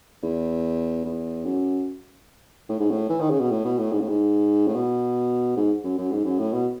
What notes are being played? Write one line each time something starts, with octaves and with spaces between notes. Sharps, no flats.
E2
E2
F#2
A2
G#2
A2
E3
D#3
C#3
B2
A2
B2
A2
G#2
A2
G#2
A2
B2
G#2
F#2
F#2
G#2
F#2
A2
B2